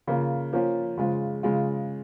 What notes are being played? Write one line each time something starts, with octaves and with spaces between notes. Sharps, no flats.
C#3 A#3 F4
F3 A#3 C#4 F4
C#3 F3 G#3 F4
C#3 G#3 F4